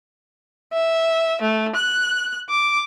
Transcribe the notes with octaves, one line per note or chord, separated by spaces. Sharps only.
E5
A3
F#6
D6